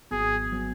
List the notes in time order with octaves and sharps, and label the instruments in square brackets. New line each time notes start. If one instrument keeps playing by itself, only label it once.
[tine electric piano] G#1 G#2 F#3 B3 [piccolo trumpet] G#4
[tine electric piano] F#3 B3